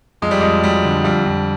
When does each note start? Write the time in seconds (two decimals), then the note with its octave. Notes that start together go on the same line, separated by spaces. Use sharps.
0.22 F2 G#3
0.31 G3
0.41 F2 G#3
0.63 F#3 G3
0.84 D3
1.04 F2 G3
1.26 F2